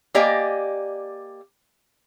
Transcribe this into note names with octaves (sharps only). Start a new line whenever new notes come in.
A#3 G4 D5 D#5 G#5